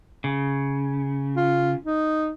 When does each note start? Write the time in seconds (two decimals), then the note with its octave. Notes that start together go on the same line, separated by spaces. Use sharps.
0.24 C#3
1.36 F4
1.86 D#4